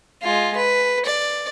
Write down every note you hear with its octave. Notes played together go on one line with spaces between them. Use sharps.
G#3 F4
B4
D5